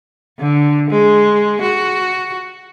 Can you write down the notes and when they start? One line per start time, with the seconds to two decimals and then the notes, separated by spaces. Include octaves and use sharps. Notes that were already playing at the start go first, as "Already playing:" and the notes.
0.39 D3
0.90 G#3
1.61 F#4